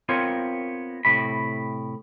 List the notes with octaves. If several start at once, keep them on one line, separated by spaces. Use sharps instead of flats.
B3 C4 F4 A#4 C#5
A2 C3 B5